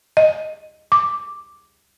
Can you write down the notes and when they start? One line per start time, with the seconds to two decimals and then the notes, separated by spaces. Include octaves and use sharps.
0.17 D#5
0.92 D6